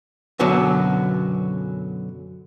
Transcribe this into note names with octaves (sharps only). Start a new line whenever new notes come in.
F#2 B2 D3 F#3